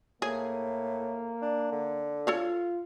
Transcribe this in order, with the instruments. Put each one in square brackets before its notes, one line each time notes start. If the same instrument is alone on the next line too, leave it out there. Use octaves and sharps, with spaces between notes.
[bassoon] A2 [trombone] A#3 [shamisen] G#4
[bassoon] D4
D3
[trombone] F4 [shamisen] A4 C#5 F5